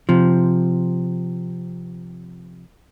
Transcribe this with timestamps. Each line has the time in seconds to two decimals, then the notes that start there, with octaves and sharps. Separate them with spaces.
0.09 C3 F3